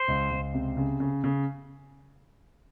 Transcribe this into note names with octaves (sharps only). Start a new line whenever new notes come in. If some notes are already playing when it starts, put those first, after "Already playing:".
Already playing: C5
C#2
C#2
C3
C#3
C#3
C#3